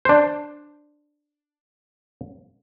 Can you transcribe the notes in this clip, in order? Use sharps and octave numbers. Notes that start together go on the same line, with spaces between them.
D4 C5